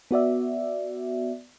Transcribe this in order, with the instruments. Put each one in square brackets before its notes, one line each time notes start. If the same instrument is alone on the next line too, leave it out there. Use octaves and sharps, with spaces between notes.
[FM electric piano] B3 F#4 D5 E5